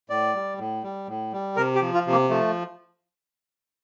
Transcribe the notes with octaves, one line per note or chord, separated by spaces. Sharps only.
A2 D5
G3
A2
G3
A2
G3
C3 A#4
G4
F3
F4
C3 A#3
F3 A3